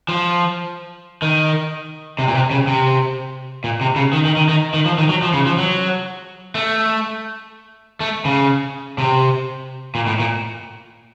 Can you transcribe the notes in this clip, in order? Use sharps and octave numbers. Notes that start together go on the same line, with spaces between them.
F3
D#3
C3
A#2
C3
C#3
C3
A#2
C3
C#3
D#3
D#3
D#3
D#3
D#3
F3
D#3
F#3
F3
C#3
F3
F#3
A3
A3
C#3
C3
A#2
A2
A#2